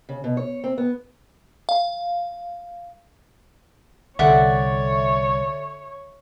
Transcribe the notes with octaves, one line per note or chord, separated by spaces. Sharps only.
C#3
B2
C#5
C4
B3
F5
C2 D3 C#5 D5 E5 F#5